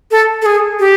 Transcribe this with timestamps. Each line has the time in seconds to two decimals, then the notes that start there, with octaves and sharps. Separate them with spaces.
0.11 A4
0.42 A4
0.46 G#4
0.80 G4